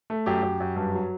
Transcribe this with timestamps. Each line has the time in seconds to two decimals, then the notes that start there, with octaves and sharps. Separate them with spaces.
0.10 A3
0.26 F#2 G4
0.43 F#2
0.60 F#2
0.76 G2
0.94 F#3